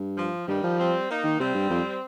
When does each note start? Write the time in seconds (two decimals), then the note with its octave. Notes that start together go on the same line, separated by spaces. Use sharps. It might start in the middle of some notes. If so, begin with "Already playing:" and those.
Already playing: G2
0.17 F3
0.47 G2 D#3 G3
0.63 F3
0.79 G3 C4
1.09 A#3 D#4
1.24 D#3
1.40 C3 G3 C4
1.55 G2
1.70 F2